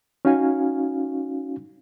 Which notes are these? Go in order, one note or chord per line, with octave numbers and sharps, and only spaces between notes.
C#4 D#4 F#4 F5 G#5